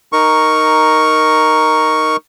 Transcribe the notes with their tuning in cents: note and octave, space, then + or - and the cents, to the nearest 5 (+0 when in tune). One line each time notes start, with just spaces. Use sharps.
D#4 +0 A#4 +0 C#6 +0